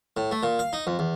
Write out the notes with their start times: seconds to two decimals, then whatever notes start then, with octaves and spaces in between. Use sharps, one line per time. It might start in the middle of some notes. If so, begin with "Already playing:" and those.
0.17 A2
0.31 A3
0.43 A#2
0.59 F5
0.73 D#4
0.87 F2
0.99 E2